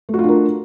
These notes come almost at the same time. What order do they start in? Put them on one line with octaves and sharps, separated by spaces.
A3 F#4 F4 D4 A#4